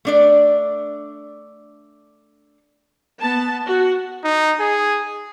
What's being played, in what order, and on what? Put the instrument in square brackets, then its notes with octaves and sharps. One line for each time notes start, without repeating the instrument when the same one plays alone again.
[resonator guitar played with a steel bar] A3 D4 D5
[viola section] B3 A5
F#4
[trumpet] D#4
G#4